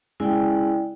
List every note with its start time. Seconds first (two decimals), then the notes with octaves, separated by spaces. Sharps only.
0.20 C#3 G#3 E4 D5 G5